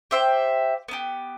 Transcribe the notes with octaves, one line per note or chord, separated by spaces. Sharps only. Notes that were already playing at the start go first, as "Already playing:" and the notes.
G4 C5 E5 G5
B3 D4 G4